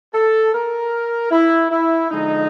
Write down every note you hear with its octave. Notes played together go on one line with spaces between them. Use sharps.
A4
A#4
E4
E4
D3 F3 G#3 D#4